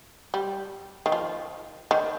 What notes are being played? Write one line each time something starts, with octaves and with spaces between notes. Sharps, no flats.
G3
D#3
F3
D#3